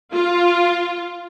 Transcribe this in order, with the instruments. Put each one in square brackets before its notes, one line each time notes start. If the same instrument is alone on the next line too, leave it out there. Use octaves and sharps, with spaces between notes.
[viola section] F4